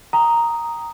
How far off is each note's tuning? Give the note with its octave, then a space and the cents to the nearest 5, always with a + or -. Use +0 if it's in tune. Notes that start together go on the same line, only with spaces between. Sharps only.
G5 +0 A#5 +0 D#6 +0